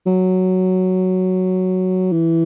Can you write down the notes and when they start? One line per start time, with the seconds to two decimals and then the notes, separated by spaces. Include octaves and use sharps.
0.07 F#3
2.12 E3